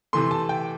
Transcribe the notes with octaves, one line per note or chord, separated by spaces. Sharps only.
C3 E3 A3 C6
A5
G5